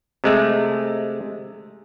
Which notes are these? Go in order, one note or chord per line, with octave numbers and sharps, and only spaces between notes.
C3 G#3 A3